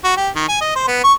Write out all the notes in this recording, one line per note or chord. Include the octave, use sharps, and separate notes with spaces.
F#4
G4
D#3
G#5
D#5
C5
B3
C#6